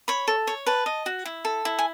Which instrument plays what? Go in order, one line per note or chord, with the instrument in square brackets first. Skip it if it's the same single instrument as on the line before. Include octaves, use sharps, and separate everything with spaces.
[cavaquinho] C#5 B5
A4
C#5
B4 A5
D#5
F#4
E4
A4
E4
G#5